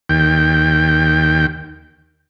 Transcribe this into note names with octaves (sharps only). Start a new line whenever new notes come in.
D#2 G5